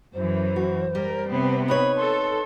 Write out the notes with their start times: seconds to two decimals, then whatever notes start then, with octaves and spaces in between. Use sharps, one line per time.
0.14 F#2 E3 C5
0.56 F#4
0.95 G3 A#4
1.29 C3 B3 C4
1.68 D#4 B4 C#5 B5
1.97 A4 C6